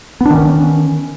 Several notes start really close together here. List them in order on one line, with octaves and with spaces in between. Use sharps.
B3 D4 D#3 C#4